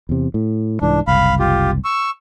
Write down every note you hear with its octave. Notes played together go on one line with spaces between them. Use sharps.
E2 C3
A2
C2 G#2 E3 D4
F#1 C2 F5 B5
F4 G4
C#6 E6